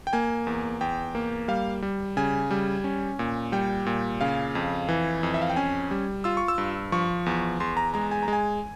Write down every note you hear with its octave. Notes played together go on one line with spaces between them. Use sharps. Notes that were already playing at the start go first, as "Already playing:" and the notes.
G5
A#3 G#5
E2
E2 G5
A#3
G3 F5
G3
C#3 G#5
G3
C#4
A#2
G3 G5
A#2
C#3 F5
F2
E3
F2
E5
F5
G5
C#4 G#5
G3
F4 E6
C#6
E6
G2
F3 C#6
E2
E2 C6
A#5
G#3 A#5
G#5
A#5
G#3
G#5